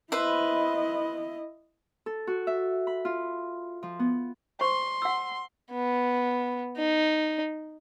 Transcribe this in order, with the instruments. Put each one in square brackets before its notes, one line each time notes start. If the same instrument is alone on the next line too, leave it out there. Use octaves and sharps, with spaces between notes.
[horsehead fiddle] E4 D#5 [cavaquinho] B4 C5 E5
[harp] A4
F#4
E5
B5
F4
F3
B3
[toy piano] C5 C#6 [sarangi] C6
[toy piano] F#5 E6
[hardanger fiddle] B3
D#4